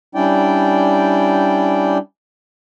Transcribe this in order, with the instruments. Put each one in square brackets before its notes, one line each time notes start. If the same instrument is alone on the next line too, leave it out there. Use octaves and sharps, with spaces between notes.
[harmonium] G3 C#4 D4 E4 D5 G5